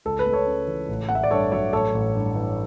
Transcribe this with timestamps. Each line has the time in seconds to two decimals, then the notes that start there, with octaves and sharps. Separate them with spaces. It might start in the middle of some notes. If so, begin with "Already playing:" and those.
0.05 C#2 A4
0.19 B4
0.26 A3
0.33 A4 C#5
0.47 C#3
0.68 E3
0.89 A1
1.09 A3 F#5
1.15 E5
1.23 D5
1.31 G2 A4 C#5
1.52 F#3 C#5 E5
1.73 A1 A4 C#5
1.94 A1
2.16 G2
2.35 E3